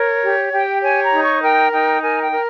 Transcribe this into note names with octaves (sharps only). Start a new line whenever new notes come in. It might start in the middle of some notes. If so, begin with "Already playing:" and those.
Already playing: A#4 C#5
G4
G4 G5
C#5 G#5
A#5
D#4
C#6
A#4 G5
D#4 G5
A#4 G#5
G5
A#4